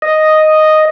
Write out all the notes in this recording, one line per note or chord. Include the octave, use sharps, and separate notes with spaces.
D#5